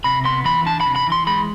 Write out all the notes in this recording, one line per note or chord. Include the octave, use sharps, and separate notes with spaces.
C3 B5
B3 C6
E3 B5
D4 A5
B5
C3
B5
E3
C6
G#3 B5